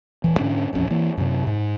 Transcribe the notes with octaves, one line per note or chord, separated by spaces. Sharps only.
D#1 E3
G#2 D3 C#4 D4
D#1 A1 F2 C#4
E3 A#3
F#2 C3
G#2